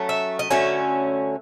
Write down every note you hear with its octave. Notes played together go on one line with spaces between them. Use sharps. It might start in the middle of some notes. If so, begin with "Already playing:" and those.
Already playing: F#3 A3 C#4
E5
D#5
D3 F#3 A3 C#4 E5